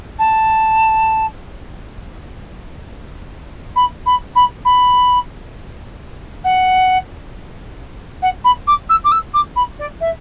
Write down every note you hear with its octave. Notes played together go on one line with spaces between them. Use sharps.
A5
B5
B5
B5
B5
F#5
F#5
B5
D6
E6
D6
E6
D6
B5
D5
E5